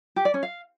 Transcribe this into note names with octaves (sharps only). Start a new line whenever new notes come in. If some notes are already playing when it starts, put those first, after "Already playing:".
G4
D5
C#4
F5